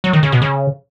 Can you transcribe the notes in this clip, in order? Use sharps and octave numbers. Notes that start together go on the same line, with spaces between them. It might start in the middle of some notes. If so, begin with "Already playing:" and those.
F#3
D#3
C#3
B2
C#3